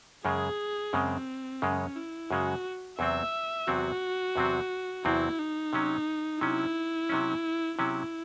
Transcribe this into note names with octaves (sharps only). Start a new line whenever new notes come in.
F#2 C#3 G#3 G#4
F#2 C#3 G#3 C4
F#2 C#3 G#3 C#4
E4
F#2 C#3 G#3 F#4
E2 C3 F#3 C4 E5
E2 C3 F#3 C4 F#4
E2 C3 F#3 C4
E2 C3 F#3 C4 E4
D#4
C3 F#3 C#4
C3 F#3 C#4 E4
C3 F#3 C#4
C3 F#3 C#4 E4